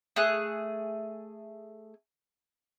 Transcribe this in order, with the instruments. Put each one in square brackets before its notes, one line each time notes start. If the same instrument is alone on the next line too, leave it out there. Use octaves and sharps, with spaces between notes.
[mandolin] A3 G#4 F#6